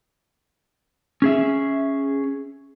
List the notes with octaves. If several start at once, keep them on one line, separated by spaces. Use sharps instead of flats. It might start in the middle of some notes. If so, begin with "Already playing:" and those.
C#4 G#4 E5